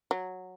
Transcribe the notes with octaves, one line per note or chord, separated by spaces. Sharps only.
F#3